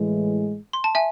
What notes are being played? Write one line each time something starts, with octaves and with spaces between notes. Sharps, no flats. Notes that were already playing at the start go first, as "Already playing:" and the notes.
Already playing: A2 E3 G#3
C6
A5
E5 G#5